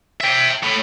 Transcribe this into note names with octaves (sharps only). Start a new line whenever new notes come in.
E5 G5
A2